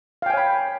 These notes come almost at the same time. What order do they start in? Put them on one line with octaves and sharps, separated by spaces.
F5 G5 G#5 C#5 B5